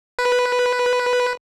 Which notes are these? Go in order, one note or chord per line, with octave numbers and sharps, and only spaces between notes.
B4